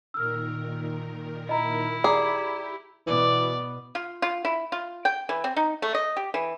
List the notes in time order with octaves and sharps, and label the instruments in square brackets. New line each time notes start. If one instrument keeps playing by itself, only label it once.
[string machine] A#2 D#3 A#4 [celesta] E6 F6
[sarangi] E4 [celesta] D#5 A#5
[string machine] G4 [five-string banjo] G#4 [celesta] D5 A#5 D6
[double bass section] B2 B3 [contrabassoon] E3 [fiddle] D5
[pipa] F4
F4
E4
F4
G5
E3
C4
D#4
A3
D#5
G4
E3